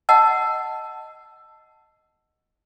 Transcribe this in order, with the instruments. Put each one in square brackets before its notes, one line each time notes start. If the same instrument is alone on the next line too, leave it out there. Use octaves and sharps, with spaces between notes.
[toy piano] D#5 F#5 A5 E6